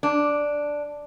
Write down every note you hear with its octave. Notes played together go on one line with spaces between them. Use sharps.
D4